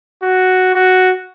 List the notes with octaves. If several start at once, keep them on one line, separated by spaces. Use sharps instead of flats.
F#4
F#4